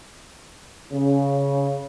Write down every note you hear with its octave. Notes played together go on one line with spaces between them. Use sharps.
C#3